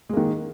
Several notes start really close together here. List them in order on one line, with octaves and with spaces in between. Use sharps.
G#3 A#3 D#3